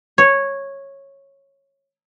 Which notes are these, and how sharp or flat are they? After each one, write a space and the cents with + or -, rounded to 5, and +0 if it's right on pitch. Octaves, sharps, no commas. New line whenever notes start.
C#5 -10